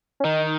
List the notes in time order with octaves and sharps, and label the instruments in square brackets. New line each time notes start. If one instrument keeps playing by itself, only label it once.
[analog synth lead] C#4
[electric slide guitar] D#3 [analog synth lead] D#4